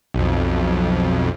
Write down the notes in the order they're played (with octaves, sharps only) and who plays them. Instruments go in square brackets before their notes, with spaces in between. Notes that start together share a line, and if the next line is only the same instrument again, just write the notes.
[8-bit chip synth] B1 F2